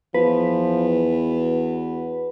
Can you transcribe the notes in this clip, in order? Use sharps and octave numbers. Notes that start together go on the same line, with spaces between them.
E2 F3 B4
F#4